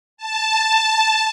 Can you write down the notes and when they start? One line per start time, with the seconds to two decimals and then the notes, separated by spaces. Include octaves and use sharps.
0.17 A5